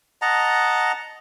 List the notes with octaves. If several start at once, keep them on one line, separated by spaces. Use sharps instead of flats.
D#5 F#5 A5 A#5